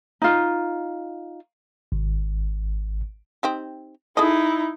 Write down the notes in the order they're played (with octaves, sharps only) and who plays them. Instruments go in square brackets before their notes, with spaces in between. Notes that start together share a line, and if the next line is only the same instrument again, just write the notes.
[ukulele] D#4 F4
[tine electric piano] G#1
[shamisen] C4 D#4 G4
[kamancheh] D#4 E4 [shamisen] G#4 A4 D#5